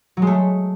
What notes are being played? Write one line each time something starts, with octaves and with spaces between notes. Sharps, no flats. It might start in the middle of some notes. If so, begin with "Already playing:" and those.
F#3
G#3
A3